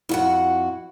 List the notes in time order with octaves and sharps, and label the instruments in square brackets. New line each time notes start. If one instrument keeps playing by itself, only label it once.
[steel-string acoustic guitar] F2 F#4 F#5 [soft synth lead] E4